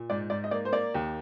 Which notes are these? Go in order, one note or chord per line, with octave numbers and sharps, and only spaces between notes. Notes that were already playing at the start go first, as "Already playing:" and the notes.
Already playing: A#2
G#2 D5
G#2 D5
D#5
A#3 D5
C5
A#3 D5
D#2